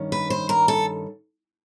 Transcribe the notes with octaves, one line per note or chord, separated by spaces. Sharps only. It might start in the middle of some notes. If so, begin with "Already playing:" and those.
Already playing: G2 D#3 C#4
B4
C5
A#4
A4